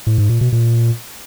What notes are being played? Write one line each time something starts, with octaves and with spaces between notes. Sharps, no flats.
A2
G#2
A#2
B2
A#2